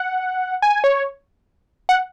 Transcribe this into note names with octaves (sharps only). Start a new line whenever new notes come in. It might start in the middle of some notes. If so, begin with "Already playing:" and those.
Already playing: F#5
G#5
C#5
F#5